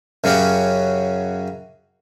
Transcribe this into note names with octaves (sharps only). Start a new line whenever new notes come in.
F#2 C#3 F#3 C#4 F#4 G4